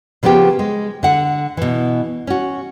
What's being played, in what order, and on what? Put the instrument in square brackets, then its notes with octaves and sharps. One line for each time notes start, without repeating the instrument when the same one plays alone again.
[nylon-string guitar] C#3 F3 A#3 B3 G4
G#3
D3 F#5
B2 E3
C#4 F#4